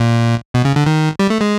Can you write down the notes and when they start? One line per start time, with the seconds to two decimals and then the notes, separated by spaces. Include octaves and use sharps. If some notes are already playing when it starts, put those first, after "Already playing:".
Already playing: A#2
0.54 B2
0.65 C#3
0.76 D3
0.86 D#3
1.19 G3
1.30 A3
1.41 G#3